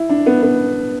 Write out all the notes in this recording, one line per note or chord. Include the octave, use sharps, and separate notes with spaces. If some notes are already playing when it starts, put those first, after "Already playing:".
Already playing: E4
D4
B3
B3